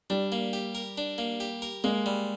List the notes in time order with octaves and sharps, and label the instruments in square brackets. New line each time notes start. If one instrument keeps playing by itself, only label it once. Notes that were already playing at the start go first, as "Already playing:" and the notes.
[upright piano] G3 [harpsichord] D4
[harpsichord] A#3
G4
A#4
D4
A#3
G4
A#4
[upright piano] G#3 [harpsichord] A#3
[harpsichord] G3